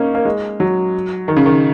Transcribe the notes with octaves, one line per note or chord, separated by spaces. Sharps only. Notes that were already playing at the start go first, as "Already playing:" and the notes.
Already playing: A#3 C#4 D#4
A#3
G#3
F#3
D#3
C#3
D#3